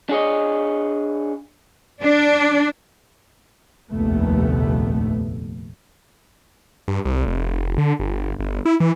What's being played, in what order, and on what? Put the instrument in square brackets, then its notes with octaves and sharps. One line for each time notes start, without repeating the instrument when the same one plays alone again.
[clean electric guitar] D4 G#4 C#5 D#5
[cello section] D4
[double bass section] F1 A#1 D#2 A3 B3
[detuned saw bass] G2
C2
F1
D3
G1
G1
E4
E3